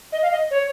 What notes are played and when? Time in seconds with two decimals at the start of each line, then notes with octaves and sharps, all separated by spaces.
0.12 D#5
0.23 F5
0.32 D#5
0.51 C#5